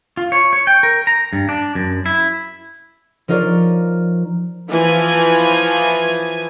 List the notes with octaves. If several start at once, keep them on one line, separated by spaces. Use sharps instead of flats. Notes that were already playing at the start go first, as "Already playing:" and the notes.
F4
C#5
C#5
G5
A#4
A#5
G2
D4
F#2
E4
F3 D#4 F4 A#4 C#5 D5
E3 F3 G#5